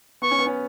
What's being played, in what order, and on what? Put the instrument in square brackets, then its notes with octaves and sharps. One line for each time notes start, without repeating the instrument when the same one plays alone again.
[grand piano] B3 [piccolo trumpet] C#6
[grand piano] C#4
B3
C#4